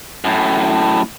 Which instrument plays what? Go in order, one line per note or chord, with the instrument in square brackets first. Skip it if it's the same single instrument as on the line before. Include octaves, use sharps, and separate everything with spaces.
[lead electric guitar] F#2 A2